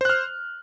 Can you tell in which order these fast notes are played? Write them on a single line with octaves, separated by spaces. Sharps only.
C5 F#6 F6